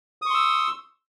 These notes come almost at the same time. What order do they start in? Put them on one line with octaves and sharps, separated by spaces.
D#6 C#6 C6 E6